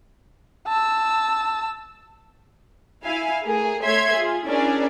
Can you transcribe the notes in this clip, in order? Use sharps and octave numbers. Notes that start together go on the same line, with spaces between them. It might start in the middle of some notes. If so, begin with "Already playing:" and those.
A5 E6
E4 F5 G#5
A3 G#4 A#4
A3 C#5 E5 C6 G#6
F4 G#4
C#4 D4 E4 G#4 A#4 D5